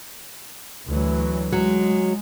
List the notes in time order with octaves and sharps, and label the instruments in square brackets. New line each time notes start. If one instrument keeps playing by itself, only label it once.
[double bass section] D2 E3 F#3
[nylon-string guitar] F#3 [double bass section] G#3